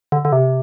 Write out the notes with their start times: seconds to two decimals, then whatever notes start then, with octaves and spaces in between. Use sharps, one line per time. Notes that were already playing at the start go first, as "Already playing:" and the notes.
0.12 D3
0.25 D3
0.32 C3